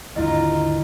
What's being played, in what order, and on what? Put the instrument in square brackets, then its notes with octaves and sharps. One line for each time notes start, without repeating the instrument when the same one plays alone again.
[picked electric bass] D#2 G#2 D3 [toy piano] E4 D#5 [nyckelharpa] F4 A#5